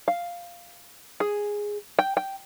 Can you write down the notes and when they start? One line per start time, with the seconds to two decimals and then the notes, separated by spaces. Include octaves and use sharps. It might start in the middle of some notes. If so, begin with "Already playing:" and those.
0.08 F5
1.20 G#4
1.99 G5
2.17 G5